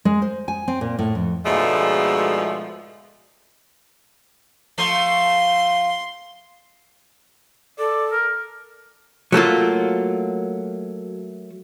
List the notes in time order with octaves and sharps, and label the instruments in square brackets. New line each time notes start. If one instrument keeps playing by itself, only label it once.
[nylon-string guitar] G#3
C5
G#5
C4
A#2
A2
F2
[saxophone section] G#2 B2 D3 F3 G#3 A3
[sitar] F3 A3 [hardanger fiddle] C6
[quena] A4 [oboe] D5
[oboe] A#4
[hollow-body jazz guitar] F#3 A3 A#3 F4